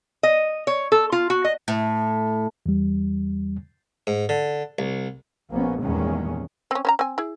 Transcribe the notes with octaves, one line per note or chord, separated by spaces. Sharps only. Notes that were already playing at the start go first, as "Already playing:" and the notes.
D#5
C#5
A4
F4
F#4
D#5
A2
E2 G3
G#2
D3
C2
A#1 A#3 B3 C#4
E2 G2 A#2 D#3 G#3 C#4
C4 C#4
C#4 C5 A#5
C4 G#5
E4 G#4